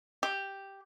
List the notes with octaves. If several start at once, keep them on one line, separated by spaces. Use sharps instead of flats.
G4